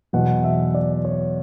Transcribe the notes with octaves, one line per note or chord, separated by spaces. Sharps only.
E2 B2 F#3 F#5
E5
D5
C#5